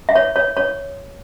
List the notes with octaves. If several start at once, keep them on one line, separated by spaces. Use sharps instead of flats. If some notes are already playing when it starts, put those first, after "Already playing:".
E5
C#5
C#5
C#5